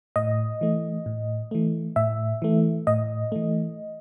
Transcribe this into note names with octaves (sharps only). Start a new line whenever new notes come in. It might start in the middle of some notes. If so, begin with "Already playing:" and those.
A2 D#5
E3 A3
A2
E3 A3
A2 E5
E3 A3
A2 D#5
E3 A3